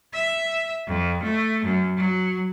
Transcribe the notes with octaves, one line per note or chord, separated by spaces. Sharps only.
E5
F2
A3
F#2
F#3